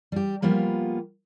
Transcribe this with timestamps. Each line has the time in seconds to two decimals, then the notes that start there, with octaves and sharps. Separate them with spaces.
0.12 G3 G4
0.42 F3 G3 A#3 B3 F4